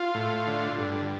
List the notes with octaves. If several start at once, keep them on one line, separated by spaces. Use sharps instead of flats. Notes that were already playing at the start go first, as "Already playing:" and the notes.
Already playing: F4
A2
D3
G2